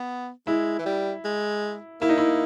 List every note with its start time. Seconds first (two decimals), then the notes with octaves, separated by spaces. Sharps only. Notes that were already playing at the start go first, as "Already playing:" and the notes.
Already playing: B3
0.47 G#3 E4
0.79 E3
0.86 G3
1.24 G#3
2.01 A#3 E4
2.09 D#4
2.18 E4